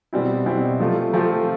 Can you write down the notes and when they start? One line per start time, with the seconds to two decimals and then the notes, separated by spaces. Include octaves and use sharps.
0.13 B2 G3 C4 E4
0.46 B2 G3 C4 E4
0.80 C3 F3 A3 C4 F4
1.13 C3 F3 A3 C4 F4